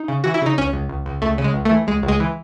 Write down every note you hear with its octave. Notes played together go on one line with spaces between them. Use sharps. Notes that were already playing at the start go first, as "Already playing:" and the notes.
Already playing: D#4
C#3
E3 F#4
E4
C#3 D#4
C#2 C#4
C#2
C#2
C#2
C#2 A3
C#3
G#3
C#2
A3
E3
C#2 G#3
C#2
G#3
E3